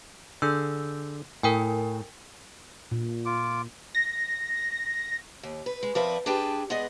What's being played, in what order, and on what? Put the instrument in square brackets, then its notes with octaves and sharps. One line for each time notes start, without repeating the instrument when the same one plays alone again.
[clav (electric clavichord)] D3 G#4 [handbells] E6 G6
[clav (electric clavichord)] A2 [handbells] A#4 G5 G#5
[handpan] A#2
[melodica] F4 D6
[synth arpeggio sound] A#6
[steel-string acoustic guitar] D#2
B4
G#3
F3 C4 A#4 B4 D5 E5
D4 G4 G#4 B4 G5 A5
G#3 B3 G#4 B4 D5 D#5